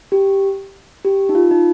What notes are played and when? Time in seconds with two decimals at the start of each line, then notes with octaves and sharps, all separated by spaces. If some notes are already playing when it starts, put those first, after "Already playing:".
0.12 G4
1.05 G4
1.29 D#4
1.35 F4
1.51 D#4